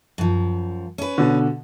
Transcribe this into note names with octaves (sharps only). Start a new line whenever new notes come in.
F#2 F3
C#4 B4
B2 D3